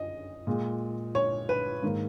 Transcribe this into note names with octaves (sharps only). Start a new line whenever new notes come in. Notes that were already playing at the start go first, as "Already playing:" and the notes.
Already playing: F#2 D#5
A#2 G#3
C#5
B4
G#2 D#3 A#3